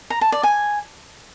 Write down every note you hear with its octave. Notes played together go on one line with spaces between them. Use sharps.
A#5
A5
D5
G#5